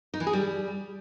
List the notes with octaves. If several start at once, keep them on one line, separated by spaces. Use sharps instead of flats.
D#4
E3
G#4
G3